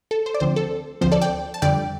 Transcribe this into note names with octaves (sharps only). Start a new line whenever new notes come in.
A4
C5
D5
D2 D3 F3 C4 C5
A4
D2 D3 F3 C4 C5
A4 D5
D5 G5
A5
F2 D3 G3 D5 G5